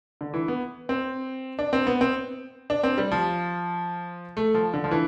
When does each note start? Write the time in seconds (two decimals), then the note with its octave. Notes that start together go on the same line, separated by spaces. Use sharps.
0.21 D3
0.34 E3
0.48 B3
0.89 C4
1.59 D4
1.73 C4
1.87 B3
2.01 C4
2.70 D4
2.83 C4
2.98 G3
3.12 F3
4.37 A3
4.54 F3
4.74 D3
4.84 F3
4.91 E3